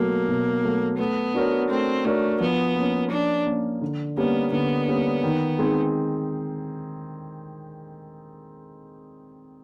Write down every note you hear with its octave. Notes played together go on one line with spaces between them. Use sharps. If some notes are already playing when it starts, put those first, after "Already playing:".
Already playing: B2 F#3 A3 A#3
B2
F#3 A3
A3 B3
D4 F#4 A#4 C#5
A3 C4
A3 D4 F#4 A#4 C#5
F3 B3
A#3 C#4
F3 D4
A#3 C#4
D3
G3 A#3 B3 C#4
D3 B3
G3 A#3 C#4
D#3
G#3 C4 D#4 G#4